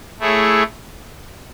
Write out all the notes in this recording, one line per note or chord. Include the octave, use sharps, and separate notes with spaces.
A3 E4 G#4 C#5